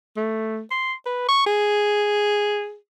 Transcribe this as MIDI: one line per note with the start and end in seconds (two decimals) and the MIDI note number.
0.17 0.62 57
0.71 0.93 84
1.06 1.27 71
1.29 1.44 85
1.46 2.76 68